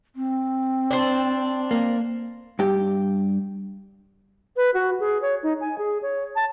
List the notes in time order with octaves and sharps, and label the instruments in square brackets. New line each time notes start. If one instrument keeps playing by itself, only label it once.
[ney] C4
[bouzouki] D4 C5
[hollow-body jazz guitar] A#3
G2 G4
[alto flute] B4
F#4
G#4
C#5
D#4
G#5
G#4
C#5
A5